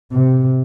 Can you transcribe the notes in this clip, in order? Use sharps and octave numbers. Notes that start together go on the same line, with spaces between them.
C3